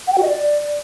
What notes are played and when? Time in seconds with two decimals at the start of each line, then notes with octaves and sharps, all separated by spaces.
0.07 F#5
0.13 G5
0.18 F#4
0.23 D#5
0.28 D5